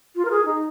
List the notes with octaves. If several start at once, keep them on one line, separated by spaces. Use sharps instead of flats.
F4
A#4
G#4
D#4